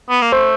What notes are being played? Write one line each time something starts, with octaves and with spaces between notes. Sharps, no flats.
B3
A#3
A3 C5